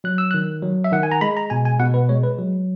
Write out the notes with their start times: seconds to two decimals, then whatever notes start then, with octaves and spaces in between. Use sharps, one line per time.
0.04 F#3 F#6
0.18 E6
0.31 D#3 F#6
0.62 F#3
0.84 E5
0.92 D#3 F#5
1.03 G#5
1.12 A#5
1.21 G#3 B5
1.37 A#5
1.50 B2 G#5
1.65 G#5
1.79 B2 F#5
1.94 B4
2.09 G#3 C#5
2.24 B4
2.39 F#3